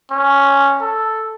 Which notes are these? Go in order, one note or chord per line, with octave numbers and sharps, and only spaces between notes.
C#4
A4